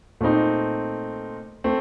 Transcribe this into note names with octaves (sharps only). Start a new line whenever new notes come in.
A#2 A3 C4 D#4
A3 C4